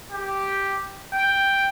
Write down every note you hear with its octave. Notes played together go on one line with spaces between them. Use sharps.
G4
G5